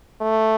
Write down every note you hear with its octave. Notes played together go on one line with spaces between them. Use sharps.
A3